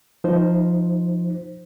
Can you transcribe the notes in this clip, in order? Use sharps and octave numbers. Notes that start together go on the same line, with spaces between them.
F3 D#4 C5